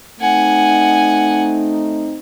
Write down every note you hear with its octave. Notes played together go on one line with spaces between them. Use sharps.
A3 C4 D#4 F#5 G#5